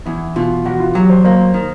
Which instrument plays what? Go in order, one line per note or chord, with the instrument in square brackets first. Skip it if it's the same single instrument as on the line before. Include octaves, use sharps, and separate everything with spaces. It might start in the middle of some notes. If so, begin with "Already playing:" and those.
[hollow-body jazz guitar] E2 [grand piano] E4
[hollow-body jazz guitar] B2 [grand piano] F4
[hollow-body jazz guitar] E2 [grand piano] F#4
[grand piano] F4
[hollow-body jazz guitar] F#3 [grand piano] G4
[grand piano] C5
[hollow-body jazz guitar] A#3 [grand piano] C5
[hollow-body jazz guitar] D#3